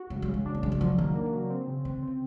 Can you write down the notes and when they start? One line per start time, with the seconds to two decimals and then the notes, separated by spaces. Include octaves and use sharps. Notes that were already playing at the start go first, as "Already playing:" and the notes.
Already playing: F#4
0.10 C#3 G#3
0.22 G3
0.28 C#3
0.34 G#3
0.46 D4
0.55 A#3
0.63 C#3 G#3
0.72 G3
0.80 F3 F#3
0.98 D#3 A#3
1.15 A#3
1.33 F#3
1.50 C4
1.67 C#3
1.85 D3 C4
2.03 C4